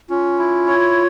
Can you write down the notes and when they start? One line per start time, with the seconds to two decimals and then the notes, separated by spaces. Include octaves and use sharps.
0.09 C#4 F4
0.38 E4
0.67 C#5